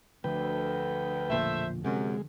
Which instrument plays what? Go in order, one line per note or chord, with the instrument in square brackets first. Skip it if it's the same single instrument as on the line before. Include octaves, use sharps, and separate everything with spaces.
[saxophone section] D2 [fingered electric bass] D3 F3 [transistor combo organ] B4 G5
[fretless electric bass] E1 A#1 A#2 [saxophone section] A3 C5 E5
[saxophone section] F#2 [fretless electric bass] C3 [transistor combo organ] G#3